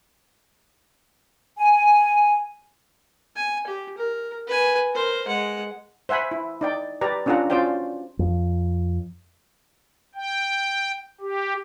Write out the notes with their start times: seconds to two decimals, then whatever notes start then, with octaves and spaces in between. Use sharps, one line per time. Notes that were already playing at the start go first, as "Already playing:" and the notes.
1.58 G#5
3.36 G#5
3.67 G4
3.98 A#4
4.47 B4 G#5
4.93 A#4 C5
5.27 G#3 F#5
6.09 C5 E5 F#5 G#5 B5
6.31 E4
6.61 D#4 D5 G5
7.01 G4 B4 D5 A#5
7.26 C#4 D4 F4 A4 F#5 A#5
7.50 C#4 F4 F#4 C5 D5 G5
8.19 F2
10.15 G5
11.21 G4